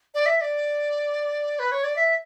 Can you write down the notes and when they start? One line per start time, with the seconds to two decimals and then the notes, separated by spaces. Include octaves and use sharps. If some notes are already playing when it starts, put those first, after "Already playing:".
0.15 D5
0.26 E5
0.38 E5
0.41 D5
1.59 B4
1.72 C#5
1.84 D5
1.96 E5